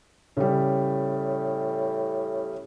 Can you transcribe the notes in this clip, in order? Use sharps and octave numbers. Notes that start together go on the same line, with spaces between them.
A2 C#3 G3